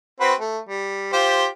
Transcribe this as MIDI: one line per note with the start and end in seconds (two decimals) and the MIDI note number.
0.20 0.34 60
0.20 0.34 66
0.20 0.34 71
0.40 0.58 57
0.69 1.08 55
1.13 1.46 65
1.13 1.46 67
1.13 1.46 72